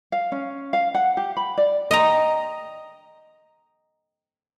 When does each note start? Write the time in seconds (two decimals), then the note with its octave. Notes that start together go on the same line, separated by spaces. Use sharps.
0.12 F5
0.32 C#4
0.73 F5
0.94 F#5
1.17 G4
1.37 B5
1.57 D5
1.91 D#5 G5 A#5